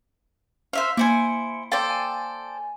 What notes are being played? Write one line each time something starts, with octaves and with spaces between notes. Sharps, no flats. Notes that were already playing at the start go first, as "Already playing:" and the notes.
C5 E5 F5
A#3 E4 C5 G#5 C#7
A4 C5 D5 F5 G5 A6
G#5